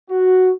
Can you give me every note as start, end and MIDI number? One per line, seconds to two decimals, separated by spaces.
0.10 0.51 66